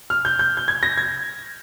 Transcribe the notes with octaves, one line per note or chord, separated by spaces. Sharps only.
F6
G6
G6
G6
G#6
A#6
G#6